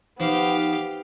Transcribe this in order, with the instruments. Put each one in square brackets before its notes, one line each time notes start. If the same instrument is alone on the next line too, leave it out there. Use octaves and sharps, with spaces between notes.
[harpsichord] F3 [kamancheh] B3 [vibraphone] D#4 [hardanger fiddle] G4 F5